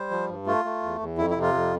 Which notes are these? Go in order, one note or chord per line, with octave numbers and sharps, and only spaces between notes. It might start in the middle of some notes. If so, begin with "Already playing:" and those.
Already playing: G3 C5
F3
G2
A3 F4
A3
E2
E2
F2 E4
E4
C3
F4
F2